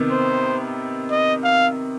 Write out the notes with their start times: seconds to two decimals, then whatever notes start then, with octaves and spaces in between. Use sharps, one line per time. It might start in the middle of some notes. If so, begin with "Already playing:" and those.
Already playing: C3 D#3 B3
0.11 C5
1.11 D#5
1.44 F5